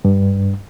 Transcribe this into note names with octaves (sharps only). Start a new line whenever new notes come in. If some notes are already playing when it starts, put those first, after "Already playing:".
G2